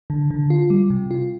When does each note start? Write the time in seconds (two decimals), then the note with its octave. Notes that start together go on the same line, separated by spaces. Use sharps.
0.10 D3
0.31 D3
0.50 F4
0.70 G3
0.90 C3
1.11 F4